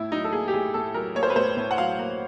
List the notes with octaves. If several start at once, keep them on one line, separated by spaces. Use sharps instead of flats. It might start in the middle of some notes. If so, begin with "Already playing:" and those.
Already playing: A2 E4
F#3 D#4
A4
A#3 G#4
G4
A2 G#4
A2 A4
F#3 A#4
A#3 C#5
C5
B4
A2 C5
A2
F#5
F#3 F5
A#3